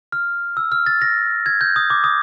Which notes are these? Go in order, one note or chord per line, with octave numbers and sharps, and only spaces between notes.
F6
E6
F6
A6
A#6
G#6
G6
D#6
D6
D#6